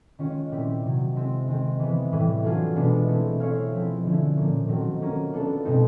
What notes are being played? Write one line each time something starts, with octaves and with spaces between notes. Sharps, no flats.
D#3 G#3 C#4 F4
A#2 G3 C4 E4 G4
C3 D#3 F#3
G#3 C4 E4
D#3 G#3 C4
E3 G#3 B3
A2 E3 G3
F#3 A3 D4 F4 G#4
B2 G#3 B3 D4 F4
A3 C4 E4
C4 E4 G#4 C#5 F5
F3 G#3 C4 E4
D3 F3 G#3 C#4 E4
A#2 F3 A#3 C#4
D#3 F#3 A3 C4
F#3 A#3 C#4 F4 A#4
B3 D4 F4 A4
B2 G#3 C4 D#4